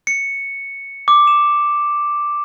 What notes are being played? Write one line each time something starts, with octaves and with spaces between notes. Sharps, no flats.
C#7
D6
E7